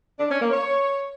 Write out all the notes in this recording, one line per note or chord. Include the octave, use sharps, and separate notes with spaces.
D4
C#4
A#3
C#5